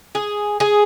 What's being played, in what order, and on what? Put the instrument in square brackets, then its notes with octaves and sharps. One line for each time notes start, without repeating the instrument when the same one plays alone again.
[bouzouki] G#4
G#4